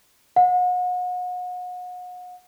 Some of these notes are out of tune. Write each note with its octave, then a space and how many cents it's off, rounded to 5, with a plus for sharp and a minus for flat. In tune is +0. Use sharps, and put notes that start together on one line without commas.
F#5 -35